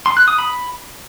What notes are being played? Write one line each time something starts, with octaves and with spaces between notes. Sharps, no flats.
C6
F#6
D#6
B5